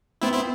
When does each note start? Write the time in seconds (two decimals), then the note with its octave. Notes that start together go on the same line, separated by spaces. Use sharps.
0.22 B3 C4 E4
0.33 C4 E4